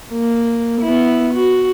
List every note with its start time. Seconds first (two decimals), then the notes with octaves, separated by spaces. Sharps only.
0.12 A#3
0.82 B3 E4
1.34 F#4